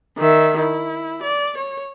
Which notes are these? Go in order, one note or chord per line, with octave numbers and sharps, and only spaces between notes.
D#3 E5
E4
D5
C#5